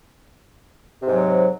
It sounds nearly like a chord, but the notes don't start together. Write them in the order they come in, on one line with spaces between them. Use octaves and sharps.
C3 G#2 F#3